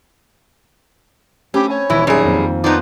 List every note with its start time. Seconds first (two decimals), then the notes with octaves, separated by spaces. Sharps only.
1.54 A3 C4 C#4 G4 B5
1.70 C#5 G#5
1.90 D#1 E3 E4
2.07 F#2 G3 G#4
2.25 F2 A#3 C4
2.64 F3 B3 D#4 A#4 C5 D5 C6